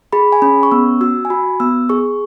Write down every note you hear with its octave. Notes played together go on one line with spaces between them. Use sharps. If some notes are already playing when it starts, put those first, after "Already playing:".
G#4 B5
G#5
C#4 B5
C#6
B3 E6
F#4 E6
G#5
F#4 B5
B3 E6
G#4 C#6